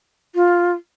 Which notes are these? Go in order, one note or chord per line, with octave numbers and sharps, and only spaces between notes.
F4